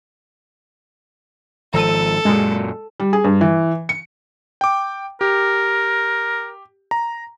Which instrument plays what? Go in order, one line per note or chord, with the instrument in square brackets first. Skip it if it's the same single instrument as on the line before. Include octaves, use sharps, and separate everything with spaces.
[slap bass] G#1 F3 [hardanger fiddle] A4 [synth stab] A#5 E6 D#7
[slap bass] F#2 A#2 [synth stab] G#3
[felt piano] G3
G#4
G2
E3
C#7
[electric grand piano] G5 D6
[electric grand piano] G4 [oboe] A#4
[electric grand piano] A#5